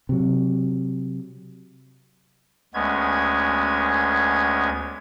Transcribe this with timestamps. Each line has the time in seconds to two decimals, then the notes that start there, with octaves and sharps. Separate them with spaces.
0.09 C3 F#3
2.74 D2 G#3 B3 C#4 G#6